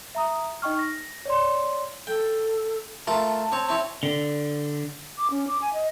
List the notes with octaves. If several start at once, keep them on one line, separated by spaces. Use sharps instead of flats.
E5 A#5 D#6
D#4 D#5 G5 C#6 F6
A#6
C#5 D5 C6
A4 G5
A3 F4 A#4 A5
C4 C#5
C4 E4 C#5
D3
D6
C#4
D6
G#5
D#5